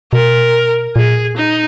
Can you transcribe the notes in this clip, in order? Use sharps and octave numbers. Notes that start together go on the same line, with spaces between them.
B2 A#4
A#2 G#4
D#4